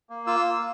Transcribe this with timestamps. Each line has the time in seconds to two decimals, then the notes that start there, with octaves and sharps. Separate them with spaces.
0.09 A#3
0.27 F4 E6
0.45 A#3